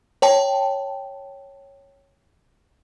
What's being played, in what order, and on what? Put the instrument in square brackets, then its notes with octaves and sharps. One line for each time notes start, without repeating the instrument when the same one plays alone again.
[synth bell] C#5 G5 A5